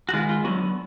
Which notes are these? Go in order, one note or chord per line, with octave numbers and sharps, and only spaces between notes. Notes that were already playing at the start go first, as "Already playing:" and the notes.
F#4
D#3 G#3 B3 F4
F4
D3 F#3 B3 F#4